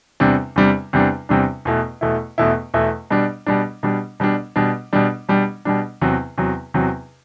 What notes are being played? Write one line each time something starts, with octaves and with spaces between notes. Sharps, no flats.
E2 C3 G3 D4
E2 C3 G3 D4
E2 C3 G3 D4
E2 C3 G3 D4
E2 B2 A3 E4
E2 B2 A3 E4
E2 B2 A3 E4
E2 B2 A3 E4
B2 G3 D4
B2 G3 D4
B2 G3 D4
B2 G3 D4
B2 G3 D4
B2 G3 D4
B2 G3 D4
B2 G3 D4
E2 C3 F#3
E2 C3 F#3
E2 C3 F#3